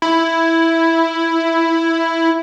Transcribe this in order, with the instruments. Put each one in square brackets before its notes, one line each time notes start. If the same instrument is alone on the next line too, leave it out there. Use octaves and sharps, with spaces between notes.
[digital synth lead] E4